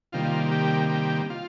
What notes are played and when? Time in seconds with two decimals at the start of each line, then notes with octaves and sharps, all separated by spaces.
0.12 C3 D#3 G3 A#3 F4
0.51 G4
0.91 G4
1.30 F4